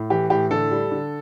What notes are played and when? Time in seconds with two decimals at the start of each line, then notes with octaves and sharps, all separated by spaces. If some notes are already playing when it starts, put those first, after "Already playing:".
Already playing: A2
0.10 E3 G4
0.30 A2 G4
0.51 D3 A4
0.71 G3
0.91 D3